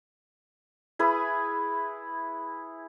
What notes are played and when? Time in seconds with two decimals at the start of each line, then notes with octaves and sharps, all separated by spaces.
0.99 E4 G#4 B4